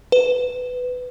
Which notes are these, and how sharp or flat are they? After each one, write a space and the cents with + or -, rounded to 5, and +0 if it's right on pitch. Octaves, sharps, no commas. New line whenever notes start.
B4 +15